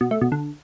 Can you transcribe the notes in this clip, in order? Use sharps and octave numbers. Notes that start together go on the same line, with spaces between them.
B2
A3
B2
D3